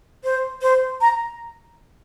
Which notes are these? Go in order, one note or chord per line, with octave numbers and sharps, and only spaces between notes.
C5
C5
A#5